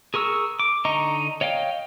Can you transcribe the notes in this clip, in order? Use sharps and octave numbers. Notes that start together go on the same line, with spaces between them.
G#4 A#4 C#6 E6
D6
D3 D#4 D#5 A#5 C#6
C#5 D#5 F5 G5